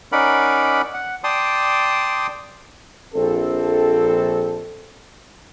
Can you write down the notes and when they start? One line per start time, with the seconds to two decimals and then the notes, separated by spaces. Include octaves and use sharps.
0.12 C#4 D#4 A#4 D5 F#5 B5
0.94 F#5
1.24 D5 G5 A5 C6 D#6
3.15 A#1 C4 A4